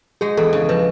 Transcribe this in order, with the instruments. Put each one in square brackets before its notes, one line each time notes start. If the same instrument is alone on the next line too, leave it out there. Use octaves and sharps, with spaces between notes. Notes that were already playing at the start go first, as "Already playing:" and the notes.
[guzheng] G#3 [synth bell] G#4
[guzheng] E2 [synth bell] A4
[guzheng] C#3
[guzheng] F3 [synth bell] B4